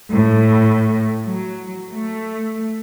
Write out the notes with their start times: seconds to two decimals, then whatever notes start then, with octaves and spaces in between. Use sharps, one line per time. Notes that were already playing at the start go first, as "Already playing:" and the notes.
0.12 A2
1.25 F#3
1.92 A3